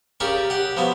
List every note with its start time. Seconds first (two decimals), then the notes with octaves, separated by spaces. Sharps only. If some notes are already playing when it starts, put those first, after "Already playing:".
0.20 C#3 G4 A#4 D5 C#6
0.50 G4 F#5
0.77 F3 F#3 B3